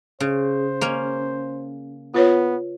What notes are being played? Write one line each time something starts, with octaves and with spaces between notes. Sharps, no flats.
C#3 C5
A#3 C#4
B3 F4 B4 C#5